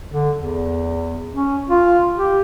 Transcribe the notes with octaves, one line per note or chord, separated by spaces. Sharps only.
D3
E2
C#4
F4
G4